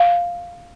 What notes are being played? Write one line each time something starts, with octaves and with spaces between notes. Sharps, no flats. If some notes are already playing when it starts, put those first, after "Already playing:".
Already playing: F5